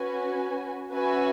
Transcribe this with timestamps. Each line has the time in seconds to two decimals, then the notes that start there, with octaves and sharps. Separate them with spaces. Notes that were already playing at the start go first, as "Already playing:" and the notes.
Already playing: C#4 F#4 B4 G#5
0.92 C#4 F#4 B4 E5 G#5